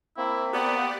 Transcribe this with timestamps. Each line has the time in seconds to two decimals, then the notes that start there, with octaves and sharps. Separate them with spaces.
0.17 A#3 C4 E4
0.53 B3 G4 D5 F#5